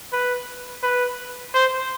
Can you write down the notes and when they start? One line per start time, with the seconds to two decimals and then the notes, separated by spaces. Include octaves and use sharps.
0.13 B4
0.83 B4
1.54 C5